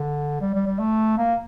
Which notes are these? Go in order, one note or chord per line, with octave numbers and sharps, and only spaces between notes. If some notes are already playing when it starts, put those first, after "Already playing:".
Already playing: D3
G3
G3
G3
A3
A#3